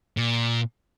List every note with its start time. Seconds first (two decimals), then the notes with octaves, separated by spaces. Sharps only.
0.17 A#2